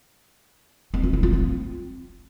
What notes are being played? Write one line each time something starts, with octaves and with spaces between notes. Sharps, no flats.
C4
F4
E4
F4
C4